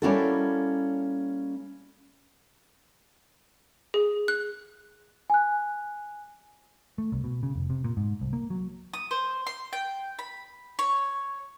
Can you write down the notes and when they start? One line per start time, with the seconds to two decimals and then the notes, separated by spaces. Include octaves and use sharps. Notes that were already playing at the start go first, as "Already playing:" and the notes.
0.02 G3 A#3 C#4 E4 F#4 A4
3.94 G#4
4.28 F#6
5.30 G#5 F#6
6.98 A3
7.12 C2
7.24 B2
7.43 C#3
7.55 F1
7.70 C3
7.84 A#2
7.97 G#2
8.21 C2
8.33 A#3
8.50 F#3
8.94 D#6
9.11 C5
9.47 C6
9.73 G5
10.19 B5
10.79 C#5